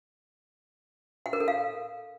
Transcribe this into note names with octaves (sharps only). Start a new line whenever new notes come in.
F#5
A#4
A4
F5